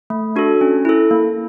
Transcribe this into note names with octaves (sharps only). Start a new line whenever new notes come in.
A3
D4 F#4 A4
C#4
E4 A4
A#3